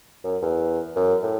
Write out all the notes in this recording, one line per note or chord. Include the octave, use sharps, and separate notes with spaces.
F#2
E2
F#2
A2